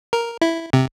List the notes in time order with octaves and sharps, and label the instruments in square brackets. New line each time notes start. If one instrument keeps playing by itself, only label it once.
[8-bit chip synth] A#4
E4
C3